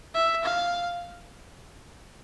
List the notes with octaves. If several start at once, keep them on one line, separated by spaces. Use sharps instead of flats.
E5
F5